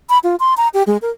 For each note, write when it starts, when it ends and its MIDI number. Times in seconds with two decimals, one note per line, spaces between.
0.10 0.18 83
0.24 0.36 65
0.40 0.54 84
0.57 0.68 82
0.74 0.83 67
0.87 0.97 56
1.02 1.10 70